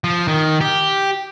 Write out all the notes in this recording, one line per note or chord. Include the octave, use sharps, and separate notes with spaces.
F3
D#3
G4